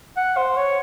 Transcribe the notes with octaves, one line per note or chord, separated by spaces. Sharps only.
F#5
C5
C#5